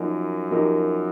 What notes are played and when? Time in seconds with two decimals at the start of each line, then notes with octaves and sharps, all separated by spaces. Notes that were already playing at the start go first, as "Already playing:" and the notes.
Already playing: F#2 F3 A#3 D#4 A#4
0.51 F3 A#3 D#4 G4 A#4